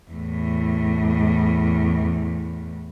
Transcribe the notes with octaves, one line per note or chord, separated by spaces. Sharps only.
E2 A2